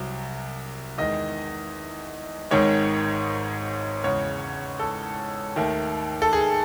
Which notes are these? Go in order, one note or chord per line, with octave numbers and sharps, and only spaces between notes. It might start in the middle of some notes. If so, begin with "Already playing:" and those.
Already playing: C2 C3 F#3
E2 D#3 G#3 D#5
G#1 G#2 D#3 G#3 C#5
E2 C#3 G#3 C#5
A4
D#2 D#3 A3
A4
G#4